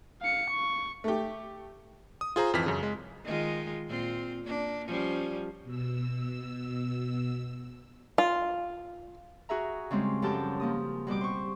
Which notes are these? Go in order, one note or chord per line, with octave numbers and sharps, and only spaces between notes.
F5 C#7
C#6
A3 G4
D#6
F4 G#4 C5 A#5
G#1 F2 E3 F6 B6
F#2 C#3
G#3
D#3 G#3 F4
A#2 C4 F4
A#3 D4
F3 G3 C#4
B2 E6
F4
F#4 G#4 E5 A#5
C#3 G3 G#3 C4
F#2 F3 G4 A4 A5 G6
F3 A#3 D#6
B2 G3 G4 D6
C5 C#6